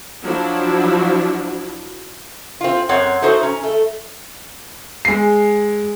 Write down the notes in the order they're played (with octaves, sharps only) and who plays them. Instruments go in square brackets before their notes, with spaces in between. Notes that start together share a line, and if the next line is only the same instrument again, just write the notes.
[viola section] F3 F#3 D4 E4 F#4
[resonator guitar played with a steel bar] C4 F4
F#2 C4 C#5 F#5
A3 D#4 F#4 C5
C#4 A#5
A3
[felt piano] G#3 C7